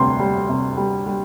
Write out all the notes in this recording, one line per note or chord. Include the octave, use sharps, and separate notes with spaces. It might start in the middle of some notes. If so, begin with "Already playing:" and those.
Already playing: D2 C3 G3 C6
G3
C3
G3
G3